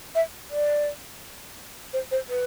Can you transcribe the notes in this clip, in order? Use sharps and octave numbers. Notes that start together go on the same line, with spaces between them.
E5
D5
C5
C5
B4